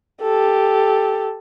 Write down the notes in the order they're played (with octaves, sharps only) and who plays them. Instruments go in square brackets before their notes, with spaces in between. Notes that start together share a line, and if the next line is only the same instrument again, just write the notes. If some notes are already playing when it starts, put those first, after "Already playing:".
[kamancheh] G4 A4